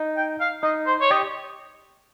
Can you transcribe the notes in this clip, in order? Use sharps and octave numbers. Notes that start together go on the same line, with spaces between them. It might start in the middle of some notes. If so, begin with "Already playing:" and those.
Already playing: D#4
G5
F5
D#4 D#5
C5
C#5
G4 D#5